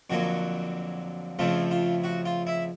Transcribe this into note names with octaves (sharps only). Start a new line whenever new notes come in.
F2 D3 F#3 A#3 F#4
F2 C#3 F3 A3 F4
F4
F#4
F4
E4